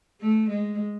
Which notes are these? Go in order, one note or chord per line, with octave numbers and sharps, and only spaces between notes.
A3
G#3